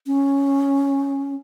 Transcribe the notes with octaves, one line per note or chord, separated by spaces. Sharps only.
C#4